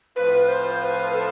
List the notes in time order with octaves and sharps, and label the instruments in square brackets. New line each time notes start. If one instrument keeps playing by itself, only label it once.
[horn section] A2 F3 C4 F4 [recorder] B4
[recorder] C5
C5
B4
A4